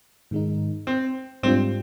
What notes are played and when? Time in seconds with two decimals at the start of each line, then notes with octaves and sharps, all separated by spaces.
0.31 G#2 D#3 G#3 D#4
0.87 C4
1.43 G#2 G3 C4 D4 F4